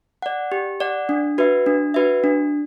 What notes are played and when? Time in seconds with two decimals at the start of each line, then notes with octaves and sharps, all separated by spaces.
0.22 D5 F#5
0.52 G4
0.80 D5 F#5
1.09 D4
1.38 F#4 B4 E5
1.66 D4
1.94 F#4 B4 E5
2.24 D4